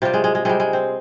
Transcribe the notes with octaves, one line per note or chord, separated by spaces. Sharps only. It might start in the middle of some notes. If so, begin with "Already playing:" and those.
C3 G3 F4
G#3
G#3
G#3
C3 G3 G#3
G#3
C4